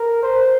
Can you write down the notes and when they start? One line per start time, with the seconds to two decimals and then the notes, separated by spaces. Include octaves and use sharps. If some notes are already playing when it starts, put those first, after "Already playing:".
Already playing: A#4
0.22 C5